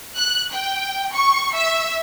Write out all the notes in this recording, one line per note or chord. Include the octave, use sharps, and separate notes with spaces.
F#6
G5
C#6
E5